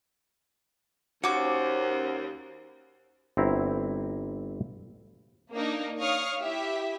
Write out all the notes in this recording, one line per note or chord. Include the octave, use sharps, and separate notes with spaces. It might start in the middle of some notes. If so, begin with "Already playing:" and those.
D#2 C#4 F#4 C5 C#5 D6
G1 C4 E4 A#5
A#3 D4 D#4 A#4
C#5 F5 C#6 D#6 F6
E4 G4 E5